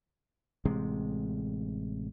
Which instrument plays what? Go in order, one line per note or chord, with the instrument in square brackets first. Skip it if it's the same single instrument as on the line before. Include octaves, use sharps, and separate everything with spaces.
[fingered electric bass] A1 C3 G#3